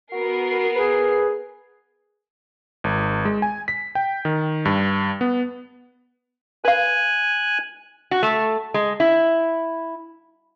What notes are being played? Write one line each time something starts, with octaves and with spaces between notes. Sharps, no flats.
B3 F#4 A#4 C7
G#4 B4
G#1
G#3
G#5
B6
G5
D#3
G2
B3
B4 F5 G#5 F#6
F#4
A3
G#3
E4